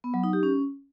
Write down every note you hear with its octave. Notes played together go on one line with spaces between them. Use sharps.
B3
F#3
D#4
G4
C#4